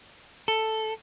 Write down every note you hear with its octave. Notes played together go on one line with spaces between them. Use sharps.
A4